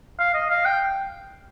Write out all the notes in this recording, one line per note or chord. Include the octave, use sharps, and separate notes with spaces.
F5
D#5
F5
G5